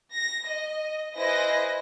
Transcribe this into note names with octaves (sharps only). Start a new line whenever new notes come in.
A#6
D#5
E4 G#4 B4 C5 D#5 A#6